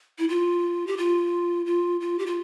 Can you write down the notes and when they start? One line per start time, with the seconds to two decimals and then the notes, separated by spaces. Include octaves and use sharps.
0.18 E4
0.29 F4
0.87 G4
0.97 F4
1.66 F4
2.01 F4
2.19 G4
2.26 F4